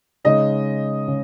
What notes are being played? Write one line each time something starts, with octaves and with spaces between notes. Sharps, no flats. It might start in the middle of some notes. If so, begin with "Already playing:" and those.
C#3 G#3 D#4 D#5
C#3